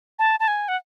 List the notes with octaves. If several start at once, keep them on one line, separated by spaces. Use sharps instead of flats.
A5
A5
G#5
F#5